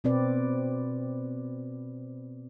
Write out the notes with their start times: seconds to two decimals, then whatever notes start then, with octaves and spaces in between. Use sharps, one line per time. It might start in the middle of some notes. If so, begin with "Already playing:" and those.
0.04 B2 C4 B4 D5